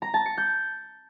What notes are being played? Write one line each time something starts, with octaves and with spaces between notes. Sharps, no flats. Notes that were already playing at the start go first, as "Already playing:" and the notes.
A#5
A5
C#7
G6